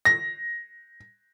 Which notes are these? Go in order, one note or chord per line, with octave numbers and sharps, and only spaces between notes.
A#6